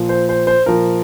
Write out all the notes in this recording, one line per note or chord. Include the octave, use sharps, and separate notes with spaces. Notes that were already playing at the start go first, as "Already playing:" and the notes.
Already playing: A#2 F3
C5
C5
C5
A#2 F3 A#4